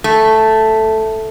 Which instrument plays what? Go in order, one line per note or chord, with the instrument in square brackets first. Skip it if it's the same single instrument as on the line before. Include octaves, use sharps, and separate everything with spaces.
[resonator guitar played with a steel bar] A3